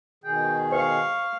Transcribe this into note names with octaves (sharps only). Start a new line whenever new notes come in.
B2 D#3 G#4 G5
C5 F5 C#6